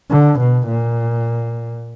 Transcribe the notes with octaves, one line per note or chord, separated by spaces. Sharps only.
D3
B2
A#2